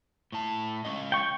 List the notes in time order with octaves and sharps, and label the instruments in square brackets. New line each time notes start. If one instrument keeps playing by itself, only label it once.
[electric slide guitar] A2 A5
G#3 C#4 D#5
[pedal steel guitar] G5 C#6